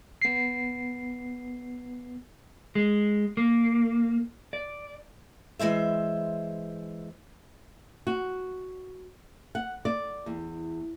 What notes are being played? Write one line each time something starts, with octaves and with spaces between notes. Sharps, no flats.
B3 C7
G#3
A#3
D5
E3 G#3 C5 E5
F#4
F#5
D5
E2